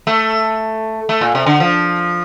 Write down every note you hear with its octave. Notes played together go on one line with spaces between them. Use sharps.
A3
A3
A#2
C3
D3
F3